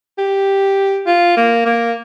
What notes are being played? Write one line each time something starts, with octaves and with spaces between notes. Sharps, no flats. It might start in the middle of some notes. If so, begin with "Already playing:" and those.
G4
F4
A#3
A#3